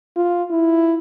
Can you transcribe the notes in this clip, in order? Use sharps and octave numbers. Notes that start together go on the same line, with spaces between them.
F4
E4